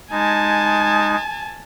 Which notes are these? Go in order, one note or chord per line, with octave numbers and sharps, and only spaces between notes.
G#3 D#4 G#5 A5